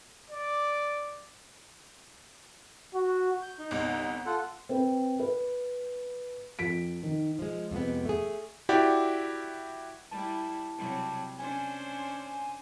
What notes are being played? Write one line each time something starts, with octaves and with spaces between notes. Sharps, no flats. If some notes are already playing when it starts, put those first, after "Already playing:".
D5
F#4
G6
D#4
G1 C2
F4 A4 F#5
C4 B4
B4
F2 B6 D7
D#3
F3 G#3
F2 C3 G#3 B3
A3 G#4
E4 F#4 G4 D5
G3 E4 A5
C3 F#3 G3
C#4 D4 C5 G#5